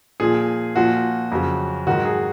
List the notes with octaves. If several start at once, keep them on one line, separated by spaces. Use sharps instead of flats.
A#2 F3 G#4
A#2 F3 F#4
F2 C#3 F#3
G#2 D#3 F#3 F#4
G#4